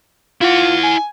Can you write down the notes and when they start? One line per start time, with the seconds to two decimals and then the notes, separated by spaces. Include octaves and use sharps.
0.41 E4 F4 F#5
0.83 G#5